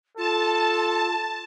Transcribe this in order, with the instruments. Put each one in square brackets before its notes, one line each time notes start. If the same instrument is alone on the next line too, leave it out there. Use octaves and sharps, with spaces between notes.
[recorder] F4 [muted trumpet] A4 [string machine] A5